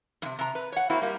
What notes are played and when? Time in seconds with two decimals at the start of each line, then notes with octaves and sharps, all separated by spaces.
0.22 G2 C3
0.39 C3 A#5
0.55 B4
0.72 C#5 F#5
0.90 A#3 C4 E4 F#4
1.02 G3 A#3